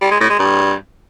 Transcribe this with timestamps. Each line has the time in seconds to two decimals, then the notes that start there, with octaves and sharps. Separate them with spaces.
0.01 G3
0.11 G#3
0.20 A2
0.30 G#3
0.39 G2